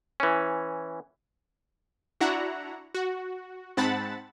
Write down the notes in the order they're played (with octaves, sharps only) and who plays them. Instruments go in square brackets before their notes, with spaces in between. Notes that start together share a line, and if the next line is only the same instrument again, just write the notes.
[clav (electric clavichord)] E3 C#4
[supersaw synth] D4 E4 F#4 F#5 A#5
F#4
G#2 C4 F#5 A5 B5 A6